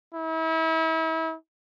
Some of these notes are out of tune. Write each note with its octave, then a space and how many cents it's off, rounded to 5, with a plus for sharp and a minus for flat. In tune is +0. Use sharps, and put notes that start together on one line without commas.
E4 -35